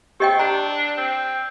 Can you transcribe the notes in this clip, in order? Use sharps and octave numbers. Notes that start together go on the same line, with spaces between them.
C4 G4 D#5 G5
D4 A#5
C4